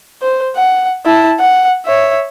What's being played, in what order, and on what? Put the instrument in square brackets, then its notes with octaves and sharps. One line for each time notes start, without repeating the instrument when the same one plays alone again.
[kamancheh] C5
F#5
E4 A5
F#5
C#5 E5